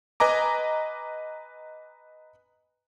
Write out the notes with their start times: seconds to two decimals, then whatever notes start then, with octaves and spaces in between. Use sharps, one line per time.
0.20 B4 D#5 G#5 A#5 D6